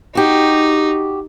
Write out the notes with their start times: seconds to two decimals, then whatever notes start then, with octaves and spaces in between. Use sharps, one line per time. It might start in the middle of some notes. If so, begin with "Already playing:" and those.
0.15 D#4 F#4 G4